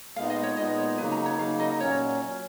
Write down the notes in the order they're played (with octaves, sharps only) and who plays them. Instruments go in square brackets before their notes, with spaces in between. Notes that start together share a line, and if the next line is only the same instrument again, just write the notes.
[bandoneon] A#2 G#3 B3 D#4 [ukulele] F5
[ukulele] D#5
C#5
[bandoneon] A#2 G#3 B3 D#4 [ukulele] D#5
[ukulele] C#5
[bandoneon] C#3 F#3 A#3 D#4 [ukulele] B4
[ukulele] A#5
C#5
[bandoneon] C#3 F#3 A#3 D#4 [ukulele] F5
[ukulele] D#5
[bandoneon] A#2 F#3 C#4 [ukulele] C#5